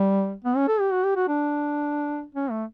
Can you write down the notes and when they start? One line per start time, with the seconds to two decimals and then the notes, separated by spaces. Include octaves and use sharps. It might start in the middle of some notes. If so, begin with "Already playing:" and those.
Already playing: G3
0.44 B3
0.56 C#4
0.68 A4
0.80 G4
0.92 F#4
1.04 G4
1.16 F#4
1.28 D4
2.35 C#4
2.50 A3